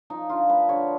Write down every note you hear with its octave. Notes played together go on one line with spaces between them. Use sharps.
F3 D#4
D3 F4
A3 B4
D3 C#5